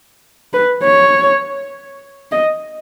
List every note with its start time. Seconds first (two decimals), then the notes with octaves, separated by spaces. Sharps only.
0.53 B4
0.83 C#5
2.32 D#5